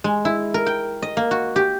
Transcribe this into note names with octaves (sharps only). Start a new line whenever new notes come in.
G#3
E4
A#4
G5
D#5
A#3
F#4
G4